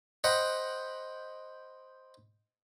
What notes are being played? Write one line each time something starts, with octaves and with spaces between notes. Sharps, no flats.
C5 D#5 F#5 G5 B5